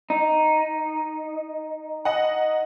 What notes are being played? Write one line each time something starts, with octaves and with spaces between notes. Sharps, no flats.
D#4
D#5 F#5